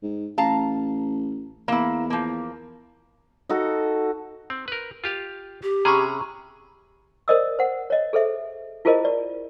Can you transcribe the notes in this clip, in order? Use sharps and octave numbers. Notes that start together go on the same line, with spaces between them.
G#2
A1 F5 A5 A#5
E2 A#3 E4
F3 A#3
D#4 F#4 A4
C4
A#4 B4
F4 G4 F5
G4
C3 C#4 G#4 A#5 B5 C#6
A#4 C5 D5 D#5 D#6 E6
C5 F#5
C#5 D#5
G#4 A4 C5 E5
E4 F4 G#4 A#4 C5 D#5
D5